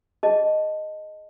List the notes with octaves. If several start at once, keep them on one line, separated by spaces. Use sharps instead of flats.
G#4 D#5 A5